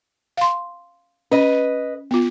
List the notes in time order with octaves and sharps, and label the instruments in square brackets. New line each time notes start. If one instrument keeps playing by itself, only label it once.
[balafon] F5 C6
[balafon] C#4 [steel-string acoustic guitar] B4 D#5
[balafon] B3 F4